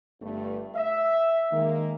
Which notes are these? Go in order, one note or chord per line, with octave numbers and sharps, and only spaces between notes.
G1 G2 A3
E5
D#3 G#3 A#3